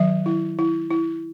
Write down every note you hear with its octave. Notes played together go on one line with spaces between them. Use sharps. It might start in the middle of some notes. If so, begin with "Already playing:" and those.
Already playing: D#3 F#3 E5
E4
E4
E4